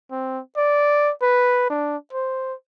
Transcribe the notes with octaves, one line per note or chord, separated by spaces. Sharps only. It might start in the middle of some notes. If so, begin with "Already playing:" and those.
C4
D5
B4
D4
C5